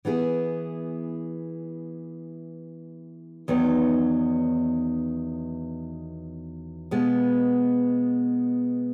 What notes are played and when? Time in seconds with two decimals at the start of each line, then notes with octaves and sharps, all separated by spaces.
0.05 E3 B3 E4 G#4
3.48 E2 D#3 F#3 B3 D#4
6.91 B2 G#3 B3